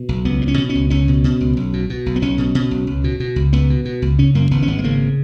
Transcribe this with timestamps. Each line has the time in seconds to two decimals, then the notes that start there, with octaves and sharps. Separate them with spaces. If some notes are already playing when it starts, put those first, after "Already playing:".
Already playing: B2
0.09 B1
0.25 C#2 B3
0.41 B2
0.48 C#4
0.58 B2
0.69 C#4
0.75 C#2
0.90 C#2 C#4
1.08 B2
1.24 B2
1.40 C#2
1.57 B1
1.73 B2
1.90 B2
2.06 B1
2.16 B3
2.22 B1 C#4
2.38 B2
2.55 B2
2.71 B1
2.87 C#2
3.04 B2
3.20 B2
3.36 C#2
3.53 C#2 B3
3.70 B2
3.85 B2
4.02 C#2
4.19 C#3 C#4
4.35 F#2 A#3
4.51 G#1 B3
4.63 C#4
4.67 G#1 B3
4.78 G#3
4.84 C#3 A#3